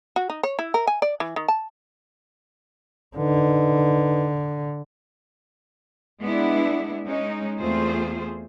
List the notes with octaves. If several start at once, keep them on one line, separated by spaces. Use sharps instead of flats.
F#4
D#4
C#5
E4
A#4
G#5
D5
E3
D#3
A5
D3 D#4 B4
G#3 B3 D4 E4
G#3 C#4 D#4
E2 A3 C4 F4 G#4 C5